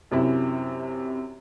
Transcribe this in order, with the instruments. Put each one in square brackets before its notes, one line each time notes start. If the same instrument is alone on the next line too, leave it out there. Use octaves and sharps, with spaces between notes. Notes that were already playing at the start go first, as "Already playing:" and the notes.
[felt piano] F#2 C3 E4